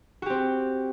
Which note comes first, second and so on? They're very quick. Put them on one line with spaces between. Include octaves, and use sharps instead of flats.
F#4 G4 C4